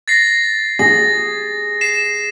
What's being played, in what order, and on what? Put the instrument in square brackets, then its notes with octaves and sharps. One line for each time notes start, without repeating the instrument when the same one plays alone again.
[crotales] A6 A#6 C7
[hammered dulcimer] G#4 [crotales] A#6
[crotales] C7 E7